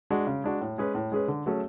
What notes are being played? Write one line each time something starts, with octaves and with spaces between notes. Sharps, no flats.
G#3 D4 F#4
C#3
G#3 D4 F#4
A2
G#3 C#4 G#4 B4
A2
G#3 C#4 G#4 B4
D3
F#3 A3 C#4 G#4